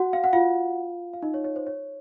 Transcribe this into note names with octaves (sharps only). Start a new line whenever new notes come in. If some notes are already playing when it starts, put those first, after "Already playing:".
Already playing: F#4 F#5
F5
F#5
F4 F5
F5
D#4 D#5
C#5
C#5
C5
C#5